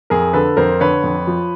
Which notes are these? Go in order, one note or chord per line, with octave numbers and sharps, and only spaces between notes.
F2 G#4 A#4
D3 A4 B4
F2 A#4 C5
D3 B4 C#5
F2
F3